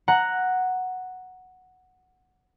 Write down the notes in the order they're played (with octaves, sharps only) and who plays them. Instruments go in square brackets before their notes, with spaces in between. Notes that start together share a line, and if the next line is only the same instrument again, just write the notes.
[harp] F#5 A#5